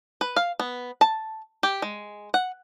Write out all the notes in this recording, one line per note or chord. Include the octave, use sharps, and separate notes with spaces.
B4
F5
B3
A5
G4
G#3
F#5